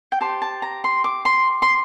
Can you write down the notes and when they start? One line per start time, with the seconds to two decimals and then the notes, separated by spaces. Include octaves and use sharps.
0.12 G5
0.21 G4 C5 A5
0.42 A5
0.62 A#5
0.84 C6
1.04 D6
1.25 C6
1.62 C6